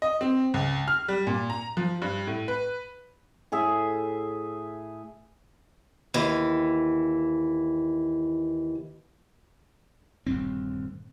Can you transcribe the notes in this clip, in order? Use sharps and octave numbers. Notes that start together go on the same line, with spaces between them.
D#5
C4
C#2
F6
G3
A#2
A#5
F3
G2
A2
B4
A2 G#4 E5
D#2 E3
D#1 D2 G2 C4